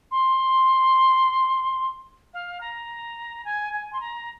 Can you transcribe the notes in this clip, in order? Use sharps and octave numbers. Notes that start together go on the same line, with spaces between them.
C6
F5
A#5
G#5
G#5
C6
A#5